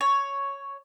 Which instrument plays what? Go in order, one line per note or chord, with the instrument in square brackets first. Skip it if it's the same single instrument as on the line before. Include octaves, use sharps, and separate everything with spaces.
[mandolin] C#5